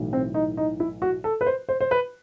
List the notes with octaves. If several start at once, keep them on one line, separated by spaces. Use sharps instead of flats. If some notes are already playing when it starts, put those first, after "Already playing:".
Already playing: B1 A2 E3
C4
D#4
D#4
E4
F#4
A4
B4
C5
C5
C5
B4